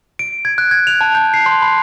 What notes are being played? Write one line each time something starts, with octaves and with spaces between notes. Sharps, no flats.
D7
G#6
F#6
G#6
F7
A5
G6
C7
C6
B5